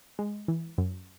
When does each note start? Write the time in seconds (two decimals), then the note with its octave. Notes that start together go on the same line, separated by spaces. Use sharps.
0.19 G#3
0.48 E3
0.78 F#2